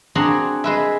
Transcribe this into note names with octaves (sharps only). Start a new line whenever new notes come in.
C4 D4 F#4 G#4 F#5 A#5
G#3 B4 E5